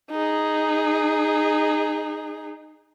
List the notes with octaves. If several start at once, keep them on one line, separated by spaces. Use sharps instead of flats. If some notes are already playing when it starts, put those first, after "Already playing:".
D#4 G#4